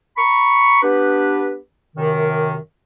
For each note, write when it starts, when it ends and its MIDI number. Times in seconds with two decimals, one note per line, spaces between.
0.17 0.78 82
0.17 0.78 83
0.17 0.78 85
0.82 1.56 59
0.82 1.56 62
0.82 1.56 67
0.82 1.56 71
1.96 2.55 42
1.96 2.55 48
1.96 2.55 51